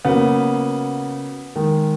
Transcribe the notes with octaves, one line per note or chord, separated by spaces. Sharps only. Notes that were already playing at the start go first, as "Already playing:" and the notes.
C#3 F#3 A#3 B3
D#3 G#3